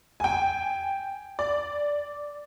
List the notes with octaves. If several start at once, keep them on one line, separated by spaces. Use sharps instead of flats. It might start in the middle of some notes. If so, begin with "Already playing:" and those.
G5 G#5
D5